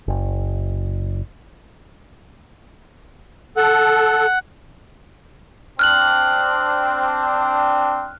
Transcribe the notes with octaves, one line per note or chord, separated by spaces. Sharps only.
F#1
A4 F#5
C4 D4 F6 F#6 F#7